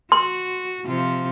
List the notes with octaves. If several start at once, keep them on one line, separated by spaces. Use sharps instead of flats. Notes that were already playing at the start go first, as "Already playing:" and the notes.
F#4 C6
C3 F3 F4